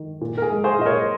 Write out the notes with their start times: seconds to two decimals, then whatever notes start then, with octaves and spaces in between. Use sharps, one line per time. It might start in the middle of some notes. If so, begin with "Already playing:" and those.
Already playing: D#3
0.21 A#2
0.38 A#4
0.42 G#4
0.50 G#3
0.64 G#4 C5
0.79 A#2 D#5
0.85 A#4 C#5